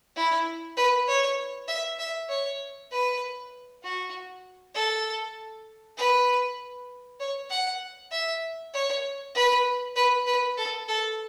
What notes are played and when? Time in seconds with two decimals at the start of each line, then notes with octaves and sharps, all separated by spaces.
0.16 E4
0.77 B4
1.08 C#5
1.68 E5
1.99 E5
2.29 C#5
2.91 B4
3.83 F#4
4.75 A4
5.97 B4
7.20 C#5
7.50 F#5
8.11 E5
8.74 C#5
9.35 B4
9.96 B4
10.26 B4
10.57 A4
10.88 A4